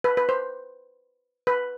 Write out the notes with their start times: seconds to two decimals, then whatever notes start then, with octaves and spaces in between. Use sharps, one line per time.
0.04 B4
0.17 B4
0.29 C5
1.47 B4